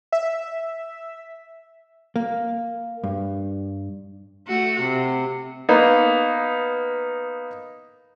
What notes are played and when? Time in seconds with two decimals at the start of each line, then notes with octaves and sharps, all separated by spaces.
0.12 E5
2.16 A#3
3.04 G2
4.48 A3 F#4
4.80 C3
5.69 A#3 B3 D#4